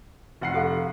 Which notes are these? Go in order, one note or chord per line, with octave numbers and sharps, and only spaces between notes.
F1 F#5 C7
G4 A4 F5